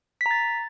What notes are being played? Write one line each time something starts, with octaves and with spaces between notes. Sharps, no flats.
A#5 A6 B6